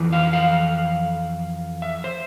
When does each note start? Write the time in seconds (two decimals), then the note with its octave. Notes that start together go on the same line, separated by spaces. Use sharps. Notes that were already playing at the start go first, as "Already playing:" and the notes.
Already playing: F2 E3
0.13 F5
0.33 F5
1.82 E5
2.04 C5